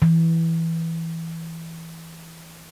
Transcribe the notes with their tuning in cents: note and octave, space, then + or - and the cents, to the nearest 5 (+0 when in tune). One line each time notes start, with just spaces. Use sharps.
E3 -5